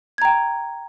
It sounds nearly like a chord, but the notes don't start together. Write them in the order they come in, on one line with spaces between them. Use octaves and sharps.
G#6 A#5 G5